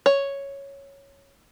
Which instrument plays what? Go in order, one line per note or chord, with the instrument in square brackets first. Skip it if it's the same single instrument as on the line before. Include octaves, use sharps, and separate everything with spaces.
[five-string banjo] C#5